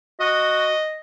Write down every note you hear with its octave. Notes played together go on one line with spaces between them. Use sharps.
F#4 D#5